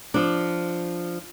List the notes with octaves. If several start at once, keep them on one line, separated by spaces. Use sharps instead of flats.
F3 D4